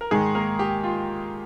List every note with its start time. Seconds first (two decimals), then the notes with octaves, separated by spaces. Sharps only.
0.01 A#4
0.11 G#2 D#3 G#3 G#4
0.35 A#3 A#4
0.59 G4
0.83 F4